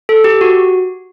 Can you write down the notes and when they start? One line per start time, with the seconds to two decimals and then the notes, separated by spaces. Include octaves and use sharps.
0.09 A4
0.24 G4
0.41 F#4